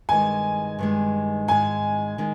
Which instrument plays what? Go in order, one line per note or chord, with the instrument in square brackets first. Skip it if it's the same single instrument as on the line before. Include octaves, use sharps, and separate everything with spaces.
[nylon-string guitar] G2 D#3 G#3 [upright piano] G#5
[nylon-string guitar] G2 D#3 G#3
[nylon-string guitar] G#2 D#3 G#3 [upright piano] G#5
[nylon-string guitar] D#3 G#3